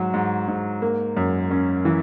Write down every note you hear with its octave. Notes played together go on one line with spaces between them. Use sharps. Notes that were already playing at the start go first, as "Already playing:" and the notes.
Already playing: G#2 F#3
G#2
G#2
A#3
F#2
C#4
E3